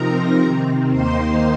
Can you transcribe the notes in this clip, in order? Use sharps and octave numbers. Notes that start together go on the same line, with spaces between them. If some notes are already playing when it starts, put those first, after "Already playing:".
Already playing: C3 F3 C4 D#4 A#4 A#5
C3 D#3 C4
D#2 D#3 A#3 D#4 C5 C6